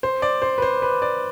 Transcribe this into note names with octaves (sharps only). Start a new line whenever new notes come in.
C5
D5
C5
B4
C5
B4
D5